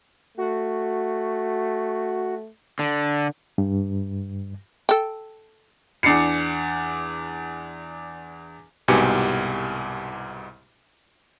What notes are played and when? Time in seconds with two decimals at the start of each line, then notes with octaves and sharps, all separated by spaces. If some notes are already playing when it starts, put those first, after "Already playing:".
0.38 A3 F#4
2.79 D3
3.58 G2
4.89 A4 G5
6.03 E2 D4 C7 C#7
8.88 C2 G#2 B2 G4 G#5 C#7